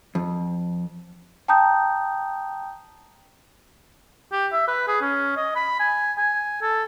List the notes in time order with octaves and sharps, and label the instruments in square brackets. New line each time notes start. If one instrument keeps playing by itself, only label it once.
[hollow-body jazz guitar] F2
[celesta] G5 A5 A#5 D#6 G6
[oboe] G4
E5
B4
G#4
C#4
D#5
B5
G#5
G#5
A4